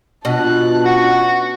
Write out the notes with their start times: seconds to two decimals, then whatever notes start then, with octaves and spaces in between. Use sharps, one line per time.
0.25 B2 D4 F4 A5 F#6
0.85 C#4 F#4 F#5